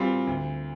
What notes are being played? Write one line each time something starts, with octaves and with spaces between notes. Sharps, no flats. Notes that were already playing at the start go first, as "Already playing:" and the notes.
Already playing: A#2 G3 C4 F4
D2